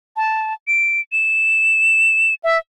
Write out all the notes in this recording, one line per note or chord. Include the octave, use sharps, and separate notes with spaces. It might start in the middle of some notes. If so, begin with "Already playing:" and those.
A5
D7
E7
E5